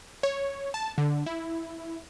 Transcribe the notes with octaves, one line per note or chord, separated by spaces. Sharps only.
C#5
A5
D3
E4